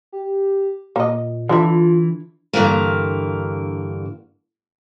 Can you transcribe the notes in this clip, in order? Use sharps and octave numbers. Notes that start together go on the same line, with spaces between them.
G4
A#2 A#3 D#5
D3 E3 D4 E4 F4
G2 D3 E3 A#3